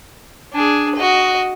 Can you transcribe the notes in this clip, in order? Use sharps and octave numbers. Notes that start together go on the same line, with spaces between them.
D4 G#4
F#4 D#5